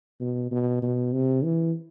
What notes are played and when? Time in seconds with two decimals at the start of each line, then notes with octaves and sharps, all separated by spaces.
0.20 B2
0.51 B2
0.82 B2
1.13 C3
1.44 E3